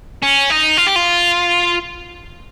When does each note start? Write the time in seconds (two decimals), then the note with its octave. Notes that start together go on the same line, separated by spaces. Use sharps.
0.22 C#4
0.50 D#4
0.77 F4
0.87 G4
0.96 F4